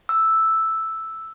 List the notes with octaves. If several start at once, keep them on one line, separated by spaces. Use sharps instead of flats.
E6